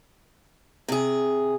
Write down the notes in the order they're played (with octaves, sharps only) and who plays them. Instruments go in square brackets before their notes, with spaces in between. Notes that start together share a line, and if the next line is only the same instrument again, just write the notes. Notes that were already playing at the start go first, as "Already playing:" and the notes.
[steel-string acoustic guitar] C3 G#4